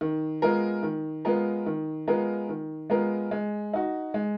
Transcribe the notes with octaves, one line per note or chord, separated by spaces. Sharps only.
D#3
G#3 B3 F4 A#4
D#3
G#3 B3 F4 A#4
D#3
G#3 B3 F4 A#4
D#3
G#3 B3 F4 A#4
G#3
D#4 F#4
G#3